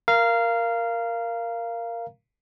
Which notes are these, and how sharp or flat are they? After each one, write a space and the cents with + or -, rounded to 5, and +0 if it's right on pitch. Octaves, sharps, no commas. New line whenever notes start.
A#4 +0 F5 -15 A#5 +0